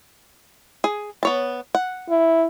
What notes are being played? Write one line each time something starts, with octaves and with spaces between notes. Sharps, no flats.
G#4
B3 C#5 A5
F#5
E4